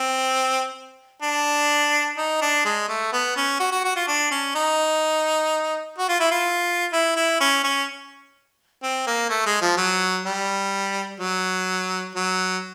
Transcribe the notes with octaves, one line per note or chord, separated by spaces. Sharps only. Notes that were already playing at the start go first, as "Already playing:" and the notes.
Already playing: C4
D4
D#4
D4
G#3
A3
B3
C#4
F#4
F#4
F#4
F4
D4
C#4
D#4
F#4
F4
E4
F4
E4
E4
C#4
C#4
C4
A#3
A3
G#3
F3
F#3
G3
F#3
F#3